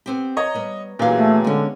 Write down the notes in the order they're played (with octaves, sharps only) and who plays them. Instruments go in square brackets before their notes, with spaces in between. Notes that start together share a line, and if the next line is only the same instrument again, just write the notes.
[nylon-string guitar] B3 C4 G4
[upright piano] C#5 D#5 [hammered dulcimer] A#5 C#6
[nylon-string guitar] G3 B3
[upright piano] A#2 E3 F#3 [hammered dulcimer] C#3 G#3 B3 [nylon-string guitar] G4 F5
[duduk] A3 [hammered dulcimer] G5
[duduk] D3 [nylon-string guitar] G#3 C#4